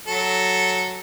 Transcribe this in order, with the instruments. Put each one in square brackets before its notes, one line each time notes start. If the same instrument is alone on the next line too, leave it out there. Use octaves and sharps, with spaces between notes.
[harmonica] F#3 A4